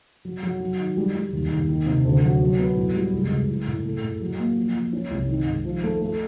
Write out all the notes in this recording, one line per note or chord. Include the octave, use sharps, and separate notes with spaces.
F#3
F#3
F#3
D#3
G3
G3
D#2
D#2
D#3
C3
D2
F#3
F#3
B3
A2
G3
C#2
C#2
E3
A2
A3
A2
F#3
A#3
F3
F3
C#4
C2
D#3
G#2
F3
A3
A3